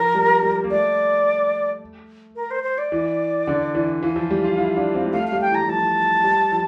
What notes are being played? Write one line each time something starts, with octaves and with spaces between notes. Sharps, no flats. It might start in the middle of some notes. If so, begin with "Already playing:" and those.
Already playing: F3 A#4
G3
G3
A#3
A3 D5
A#4
C5
C5
D5
E3
D3
E3
E3 F5
F3
G3
F4
E4
D4
C4
G3
A3 F5
G3 F5
G5
E3 A#5
G3
F3 A5
G3
F3